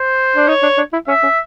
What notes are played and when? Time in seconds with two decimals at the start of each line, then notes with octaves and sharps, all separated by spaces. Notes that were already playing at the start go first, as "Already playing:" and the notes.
Already playing: C5
0.36 D4
0.48 D#4 C#5
0.63 D4
0.78 D4
0.93 E4
1.08 C#4 E5
1.23 C#4